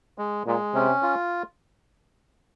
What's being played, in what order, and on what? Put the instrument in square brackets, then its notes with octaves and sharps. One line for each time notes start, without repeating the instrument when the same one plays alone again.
[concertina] G#3
[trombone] A#2 [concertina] G#3
[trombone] C3 [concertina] C#4
[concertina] F4